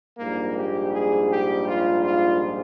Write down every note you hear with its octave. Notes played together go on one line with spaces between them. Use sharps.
A#1 G#2 G3 A#3
G4
G#4
G4
F4
F4